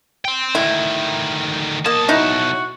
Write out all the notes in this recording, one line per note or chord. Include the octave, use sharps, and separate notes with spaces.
G5 C6
D2 D#3 E4
B1 A#3 D#5 A5
D#4 E4 F#4